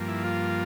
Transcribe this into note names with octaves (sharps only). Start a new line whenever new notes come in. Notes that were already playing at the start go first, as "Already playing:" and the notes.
Already playing: G2 F3 A#3
E4
F4